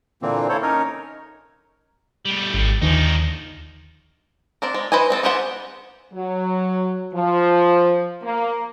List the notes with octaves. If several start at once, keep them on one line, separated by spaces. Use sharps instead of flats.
A#2 D3 E3 A#3 C4
A#3 E4 A4 C5 C#5
C#4 D#4 A#4 C#5
G3 A3
G#1
D#2 D3 D#3 F3 D#4
C4 D4 A#4
G#3
E3 B4 C5 D#5 G#5
G#3 C4 A4
B3 G4 G#4 C5 F#5
F#3
F3
A#3